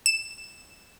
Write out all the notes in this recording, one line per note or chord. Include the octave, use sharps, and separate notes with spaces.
E7